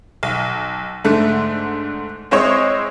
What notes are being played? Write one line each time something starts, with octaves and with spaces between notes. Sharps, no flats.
B1
G#2 D3 A3
G#3 C4 E4 C5 C#5 D#5